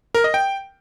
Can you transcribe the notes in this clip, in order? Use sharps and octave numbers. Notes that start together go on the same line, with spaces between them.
A#4
D#5
G5